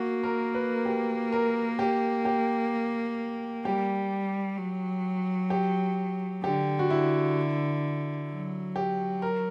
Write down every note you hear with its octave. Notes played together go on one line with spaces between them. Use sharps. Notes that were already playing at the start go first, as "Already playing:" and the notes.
Already playing: A#3 F#4
A#4
B4
G4
A#4
G4
G4
G3 G4
F#3
G4
D3 G4
F#4
E4
F#3
G4
A#4